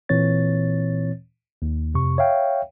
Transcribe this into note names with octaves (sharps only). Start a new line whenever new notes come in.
A#2 E3 C4 C#5 A6
D#2
F2 C3 C#6
C#5 E5 F5 G5